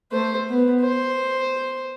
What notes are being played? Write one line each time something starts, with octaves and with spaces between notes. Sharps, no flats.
A3 C5
B3
C5